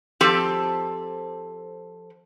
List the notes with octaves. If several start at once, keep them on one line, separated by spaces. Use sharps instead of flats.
F3 C4 G4 A4